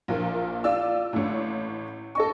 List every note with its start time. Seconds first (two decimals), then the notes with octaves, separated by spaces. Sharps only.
0.08 A#1 A#2 A#4
0.64 F4 D5 E6
1.13 A1 A2
2.15 A4 D#5 C#6